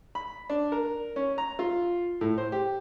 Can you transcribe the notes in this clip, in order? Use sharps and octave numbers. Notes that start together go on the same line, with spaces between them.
B5
D4
A#4
C#4
A#5
F4
A2
C5
G4